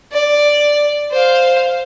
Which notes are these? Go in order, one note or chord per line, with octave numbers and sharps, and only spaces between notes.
D5
C5 F5